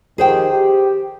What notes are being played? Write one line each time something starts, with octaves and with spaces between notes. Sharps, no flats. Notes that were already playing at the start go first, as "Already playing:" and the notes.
D#3 F3 G4 G#4 C5 G5
G4